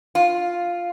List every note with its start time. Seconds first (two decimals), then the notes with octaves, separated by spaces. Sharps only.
0.15 F4